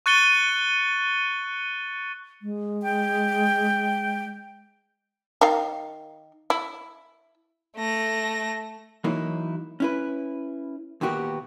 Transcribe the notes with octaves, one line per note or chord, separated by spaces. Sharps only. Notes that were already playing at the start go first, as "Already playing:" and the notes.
C#6 F#6 A6 C#7 D#7 G7
G#3
G5
D#3 F5
E4
A3 A#6
E3 F#3 A#3 D#4 E4
C#4 E4 B4
D#2 A#2 B3 F#4 G4 A#4